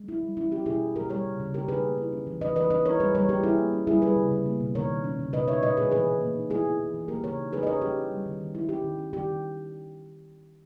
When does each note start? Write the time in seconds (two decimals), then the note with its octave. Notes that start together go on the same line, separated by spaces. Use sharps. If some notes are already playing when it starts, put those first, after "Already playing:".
Already playing: G#3
0.08 E4
0.23 G3
0.37 C#4 E4
0.51 C#4 G4
0.66 B2 E4 G#4
0.80 B2
0.96 E4 G4 A#4
1.09 G3 A#4 C#5
1.25 C#3
1.40 C#3
1.54 D#3 G4 A#4
1.68 D#4 G#4 B4
1.83 A#3
1.98 E4
2.13 C#4
2.27 E3
2.41 E3 B4 D#5
2.56 E3 B4 D#5
2.70 C#4 B4 D#5
2.85 E4 A#4 C#5
3.00 G3 G#4 B4
3.15 G3 A#4 C#5
3.29 G3 G4 A#4
3.44 E4 G#4
3.58 A#3
3.73 C#4
3.87 G3 E4 G#4
4.02 G3 G#4 B4
4.16 C#3
4.31 C#3
4.46 A#3
4.60 B2
4.75 D#3 A#4 C#5
4.90 D#3
5.04 C#4
5.19 C#3
5.33 B2 B4 D#5
5.48 D#4 C#5 E5
5.62 A#2 B4 D#5
5.77 G#3 G#4 B4
5.91 E3 G#4 B4
6.07 C#4
6.21 A#3
6.35 D#4
6.50 B3 E4 G#4
6.65 E4
6.79 E3
6.94 E3
7.08 A#3 G4 A#4
7.23 C#3 A#4 C#5
7.38 D#4
7.52 D#4 G#4 B4
7.63 D#5
7.67 C#4 A#4 C#5
7.81 C#4 G4
7.96 E4
8.11 G3
8.26 D#3
8.40 D#3
8.54 G#3 E4
8.69 C#4 G4
8.84 D#3
8.99 C#4
9.13 D#3 G4
9.28 D#3